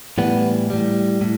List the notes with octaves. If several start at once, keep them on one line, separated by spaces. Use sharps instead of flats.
A2 E3 G3 B3
A2 G3
A2